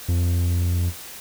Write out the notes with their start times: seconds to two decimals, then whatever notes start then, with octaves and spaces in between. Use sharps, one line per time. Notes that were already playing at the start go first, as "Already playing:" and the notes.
0.08 F2